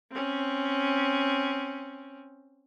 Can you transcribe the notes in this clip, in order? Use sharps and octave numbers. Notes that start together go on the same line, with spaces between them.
C4 C#4